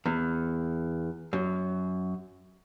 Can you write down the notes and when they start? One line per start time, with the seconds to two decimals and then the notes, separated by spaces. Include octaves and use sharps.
0.06 E2
1.33 F#2